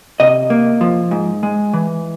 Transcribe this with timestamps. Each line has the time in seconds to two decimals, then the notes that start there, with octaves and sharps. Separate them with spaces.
0.20 C3 D#5
0.50 A#3
0.81 F3
1.11 G#2
1.43 G#3
1.74 E3